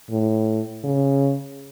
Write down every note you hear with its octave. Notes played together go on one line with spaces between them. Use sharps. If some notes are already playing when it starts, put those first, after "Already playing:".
A2
C#3